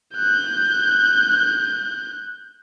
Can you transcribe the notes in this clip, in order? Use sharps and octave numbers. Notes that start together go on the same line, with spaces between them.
F#6 G6